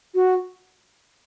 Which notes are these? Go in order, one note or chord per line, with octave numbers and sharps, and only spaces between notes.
F#4